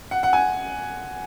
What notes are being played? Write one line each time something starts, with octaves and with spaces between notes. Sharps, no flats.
F#5
F#5
G#5